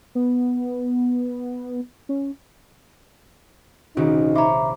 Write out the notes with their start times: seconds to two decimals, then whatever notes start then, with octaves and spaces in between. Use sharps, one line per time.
0.15 B3
2.09 C#4
3.97 A#1 C3 D#3 C#4 D#4 F#4
4.35 C5 C#5 E5 A#5 B5 D6